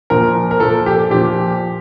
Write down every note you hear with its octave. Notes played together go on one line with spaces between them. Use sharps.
A#2 F3 A#4
A#4
A#2 F3 A4
G4
A#2 F3 G4